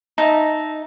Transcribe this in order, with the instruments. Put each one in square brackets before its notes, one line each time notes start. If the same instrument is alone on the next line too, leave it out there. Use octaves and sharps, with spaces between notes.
[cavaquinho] D#4 [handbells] E5 A5